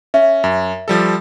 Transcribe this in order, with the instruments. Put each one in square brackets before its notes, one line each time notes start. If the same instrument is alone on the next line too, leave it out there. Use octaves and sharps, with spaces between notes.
[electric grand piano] C#4 [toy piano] E5
[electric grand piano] F#2
F3 G3 A4